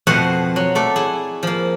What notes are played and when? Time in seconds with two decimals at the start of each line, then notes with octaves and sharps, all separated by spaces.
0.07 F2 B2 A3 C5 D#5 F#5
0.56 F#3
0.75 A3 A4 D5
0.96 E4 G#4
1.43 F3 A#3